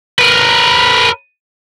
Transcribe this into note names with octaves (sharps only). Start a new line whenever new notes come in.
A#4 B4